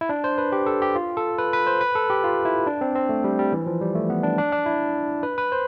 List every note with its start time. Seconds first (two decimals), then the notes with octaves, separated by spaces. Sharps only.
0.01 E4
0.09 D4
0.24 C5
0.38 B4
0.52 G4
0.66 A4
0.82 G4
0.95 F4
1.17 A4
1.38 B4
1.53 B4
1.67 C5
1.81 B4
1.95 A4
2.10 G4
2.24 F4
2.45 E4
2.67 D4
2.81 C4
2.95 C4
3.09 A3
3.24 G3
3.39 G3
3.52 E3
3.66 F3
3.81 G3
3.95 A3
4.10 B3
4.23 D4
4.38 D4
4.52 D4
4.66 E4
5.23 B4
5.38 B4
5.52 C5